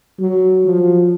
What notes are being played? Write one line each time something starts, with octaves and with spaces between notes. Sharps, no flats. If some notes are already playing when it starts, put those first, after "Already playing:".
F#3
F3